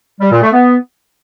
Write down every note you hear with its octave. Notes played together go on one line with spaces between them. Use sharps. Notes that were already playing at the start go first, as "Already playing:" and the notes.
G3
A#2
A3
B3